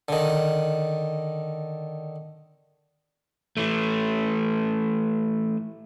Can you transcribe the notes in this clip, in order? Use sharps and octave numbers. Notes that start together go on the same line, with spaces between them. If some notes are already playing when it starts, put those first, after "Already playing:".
D3 D#3
E3 A3